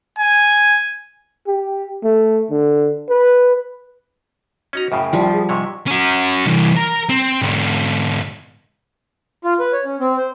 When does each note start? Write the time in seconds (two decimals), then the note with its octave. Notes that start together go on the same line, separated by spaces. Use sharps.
0.19 G#5
1.47 G4
2.03 A3
2.50 D3
3.10 B4
4.73 C#4 D#4 F#4 A#5
4.92 F#2 A2 C#3 G5
5.13 F3 G3
5.33 G#4
5.49 G#2 C3 C#5 C#6
5.87 C#4 F#4
6.46 C2 E3
6.77 A#4
7.09 C4
7.42 G#2 D3
9.45 F4
9.60 B4
9.73 C#5
9.85 C#4
10.00 C4
10.17 C5